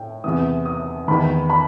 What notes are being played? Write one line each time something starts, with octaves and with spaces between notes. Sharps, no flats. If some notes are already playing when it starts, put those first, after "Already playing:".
Already playing: A2 G5
E2 C3 E3 D#6
D#6
E2 D#3 B5
B5